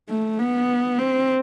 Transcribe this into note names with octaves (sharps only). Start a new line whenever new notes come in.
A3
B3
C4